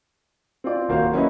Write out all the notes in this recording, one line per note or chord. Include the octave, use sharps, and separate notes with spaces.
C4 F4 D5
D#1 A#3 F#4 C5 F5
F#3 A#3 C#4 E4 B4 D#5